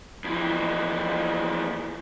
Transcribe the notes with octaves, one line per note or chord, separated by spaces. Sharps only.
F2 E3